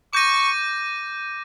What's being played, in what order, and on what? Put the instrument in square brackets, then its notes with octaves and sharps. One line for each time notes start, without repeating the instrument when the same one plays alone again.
[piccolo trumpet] C#6 [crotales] D6 G6 A#6 D#7